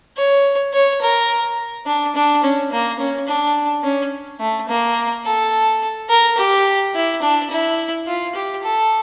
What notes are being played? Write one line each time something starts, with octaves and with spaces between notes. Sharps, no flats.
C#5
C#5
A#4
D4
D4
C#4
A#3
C#4
D4
C#4
A3
A#3
A4
A#4
G4
E4
D4
E4
F4
G4
A4